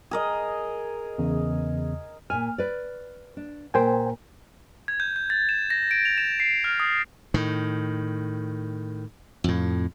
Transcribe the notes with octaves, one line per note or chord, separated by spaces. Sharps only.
G#4 A#4 D#5
E2 C#3
A#2 G#5 F6
B4 D5
D4
A#2 A#4 C5 G5 G#5
G#6
G6
G6
A6
E7
A#6
D7
F7
E7
C7
F6
D#6
A2 D#3
F2 A2